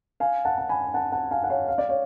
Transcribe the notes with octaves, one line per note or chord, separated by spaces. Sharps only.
F5 G#5
F#5 A5
A5
G#5 B5
F#5 A5
F#5 A5
F5 G#5
F#5
C#5 F5
F5
D5
C#5 F5